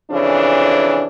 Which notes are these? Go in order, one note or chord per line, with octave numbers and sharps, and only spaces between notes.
F2 C#3 E3 D4